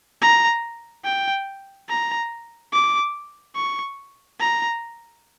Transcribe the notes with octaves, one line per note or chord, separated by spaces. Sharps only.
A#5
G5
A#5
D6
C#6
A#5